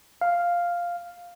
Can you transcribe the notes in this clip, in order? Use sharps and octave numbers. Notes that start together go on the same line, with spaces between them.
F5